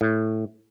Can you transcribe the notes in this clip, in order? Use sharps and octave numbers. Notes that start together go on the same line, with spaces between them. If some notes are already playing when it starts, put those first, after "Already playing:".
A2